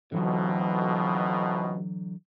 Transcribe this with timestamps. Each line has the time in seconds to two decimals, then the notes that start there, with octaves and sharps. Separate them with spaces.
0.12 A1 F2 B2 D3 E3 F#3